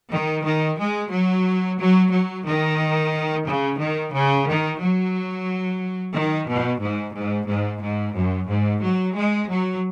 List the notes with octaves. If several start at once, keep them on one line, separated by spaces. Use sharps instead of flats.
D#3
D#3
G#3
F#3
F#3
F#3
D#3
C#3
D#3
C#3
D#3
F#3
D#3
B2
G#2
G#2
G#2
G#2
F#2
G#2
F#3
G#3
F#3